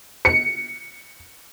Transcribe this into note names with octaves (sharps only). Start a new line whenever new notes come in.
C#7